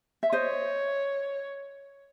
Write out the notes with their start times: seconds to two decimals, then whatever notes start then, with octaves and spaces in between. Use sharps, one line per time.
0.23 E5
0.32 C5 C#5 D#5